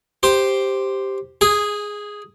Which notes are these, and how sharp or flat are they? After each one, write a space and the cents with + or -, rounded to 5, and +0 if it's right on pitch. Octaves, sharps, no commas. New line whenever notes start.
G4 +0 C5 +0
G#4 +0 G#5 -20